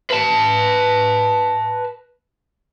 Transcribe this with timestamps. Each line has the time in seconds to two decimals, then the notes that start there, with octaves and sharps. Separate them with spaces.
0.10 B4 A5